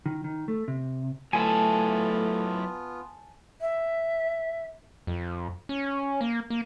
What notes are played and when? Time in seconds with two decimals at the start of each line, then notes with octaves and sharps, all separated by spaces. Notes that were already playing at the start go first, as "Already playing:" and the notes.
0.06 D#3
0.24 D#3
0.48 A3
0.68 C3
1.33 F#3 A3 B3 E4 F4 G#5 A5
3.61 E5
5.07 F2
5.69 C#4
6.21 A#3
6.50 A#3